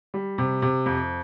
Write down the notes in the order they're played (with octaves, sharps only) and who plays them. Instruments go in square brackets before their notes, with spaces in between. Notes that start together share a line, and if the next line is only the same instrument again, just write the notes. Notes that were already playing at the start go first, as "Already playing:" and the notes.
[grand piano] G3
C3
C3
F2